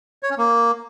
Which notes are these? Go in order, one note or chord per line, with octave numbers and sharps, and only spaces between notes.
C#5
C#4
A#3